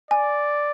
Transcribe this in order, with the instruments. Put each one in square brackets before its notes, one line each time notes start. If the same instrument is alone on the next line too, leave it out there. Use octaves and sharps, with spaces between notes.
[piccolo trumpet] D5 [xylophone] G#5